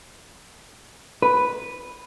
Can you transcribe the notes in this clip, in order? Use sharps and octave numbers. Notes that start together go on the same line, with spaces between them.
B4